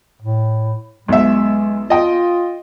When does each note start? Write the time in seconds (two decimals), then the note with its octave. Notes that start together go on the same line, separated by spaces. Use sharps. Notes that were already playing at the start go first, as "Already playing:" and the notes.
0.22 A2
1.08 B1 G#3 E5
1.90 F4 D#5 G5